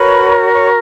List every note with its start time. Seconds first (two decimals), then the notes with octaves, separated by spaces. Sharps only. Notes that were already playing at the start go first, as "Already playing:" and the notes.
Already playing: F#4 A#4 B4 C#5 B5
0.52 C#5 C#6